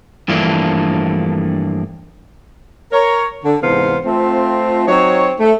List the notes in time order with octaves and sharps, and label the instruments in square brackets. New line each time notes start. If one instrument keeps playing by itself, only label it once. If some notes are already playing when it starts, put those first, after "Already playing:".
[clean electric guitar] G2 E3 F3 A3 A#3 D4
[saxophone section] A#4 C#5
D3
E2 G#2 C3 B3 C5 F5
A3 C4 F4
F#3 C4 D#4 C5 C#5
A3